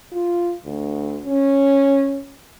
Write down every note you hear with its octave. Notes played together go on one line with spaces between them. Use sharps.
F4
D2
C#4